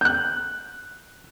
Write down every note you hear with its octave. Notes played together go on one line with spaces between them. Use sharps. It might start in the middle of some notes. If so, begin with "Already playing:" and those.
F#6 G6